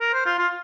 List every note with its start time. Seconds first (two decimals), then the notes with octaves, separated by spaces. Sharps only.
0.01 A#4
0.14 C5
0.26 F4
0.39 F4